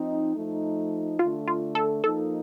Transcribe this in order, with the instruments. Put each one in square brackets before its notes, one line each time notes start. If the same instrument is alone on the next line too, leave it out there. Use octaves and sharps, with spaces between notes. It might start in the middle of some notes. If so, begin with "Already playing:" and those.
Already playing: [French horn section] F3 C4 D#4
F3 A3 D#4
[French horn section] D3 A3 D4 [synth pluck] F4
[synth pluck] F4
A4
[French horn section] F3 A#3 D#4 [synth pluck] A4